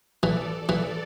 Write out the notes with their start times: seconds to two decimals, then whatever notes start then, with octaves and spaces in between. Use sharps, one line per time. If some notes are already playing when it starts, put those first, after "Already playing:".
0.23 E3 A4 D5
0.69 E3 A4 D5